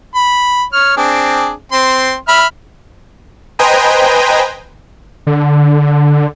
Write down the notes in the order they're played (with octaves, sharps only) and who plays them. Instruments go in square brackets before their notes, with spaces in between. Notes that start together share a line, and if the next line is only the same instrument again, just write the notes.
[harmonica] B5
C#5 F6
C4 D4 G#4
C4 C6
E5 B5 F6
[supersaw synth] B4 C5 D#5 G5 G#5 A#5
[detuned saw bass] D3